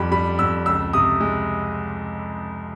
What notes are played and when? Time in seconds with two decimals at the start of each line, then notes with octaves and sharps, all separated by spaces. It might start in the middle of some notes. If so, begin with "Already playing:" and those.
Already playing: F2 G3 B5
0.11 G3 B5
0.39 F2 E6
0.66 C#2 E6
0.93 C3 D#6
1.21 G#3